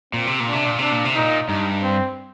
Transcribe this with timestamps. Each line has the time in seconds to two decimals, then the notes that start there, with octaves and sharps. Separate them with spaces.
0.13 A#2 C4
0.27 C3
0.40 A#2
0.48 D4
0.53 C3
0.65 A#2
0.79 C3 D4
0.92 A#2
1.05 C3
1.15 A#2 D#4
1.48 G2 D#4
1.82 C4